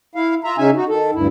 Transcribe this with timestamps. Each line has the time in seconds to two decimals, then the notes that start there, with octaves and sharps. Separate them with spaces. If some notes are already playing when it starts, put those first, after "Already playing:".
0.15 E4 F5
0.44 F4 E5 A#5
0.58 C#3 C#4 D#4 E5 G#5
0.76 D#4 F#4
0.89 D#3 A4
1.14 D2 G2 E4